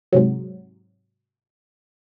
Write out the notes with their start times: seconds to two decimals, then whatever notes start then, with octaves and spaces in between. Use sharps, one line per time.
0.12 G#2 C3 F#3